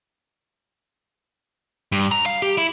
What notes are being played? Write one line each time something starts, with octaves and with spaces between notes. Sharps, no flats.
G2
A#5
F5
G4
E4